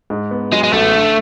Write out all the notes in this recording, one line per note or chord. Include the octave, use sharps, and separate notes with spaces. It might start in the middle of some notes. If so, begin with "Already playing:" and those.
G#2
B3
F#3 G#3
G#3
A1 A3
D3